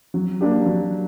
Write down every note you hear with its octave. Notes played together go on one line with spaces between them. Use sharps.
F#3
A#3 D4 G4
F#3